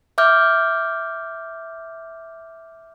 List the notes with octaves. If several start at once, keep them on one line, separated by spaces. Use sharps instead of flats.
E5 D6 F6 G6